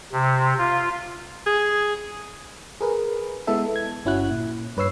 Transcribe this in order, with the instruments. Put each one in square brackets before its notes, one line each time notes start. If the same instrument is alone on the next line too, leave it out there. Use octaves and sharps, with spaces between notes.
[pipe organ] C3
F4
[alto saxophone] G#4
[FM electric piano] G#4 A#4 B4
G#3 B3 E4 A4 E5
G#6
G1 C#4 E4 F#4 F#6
A#2
G2 B4 C#5 E6 C7